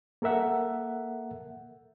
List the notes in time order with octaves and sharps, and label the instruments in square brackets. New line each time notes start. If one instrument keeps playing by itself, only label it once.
[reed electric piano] A#3 A4 A#4 E5 F#5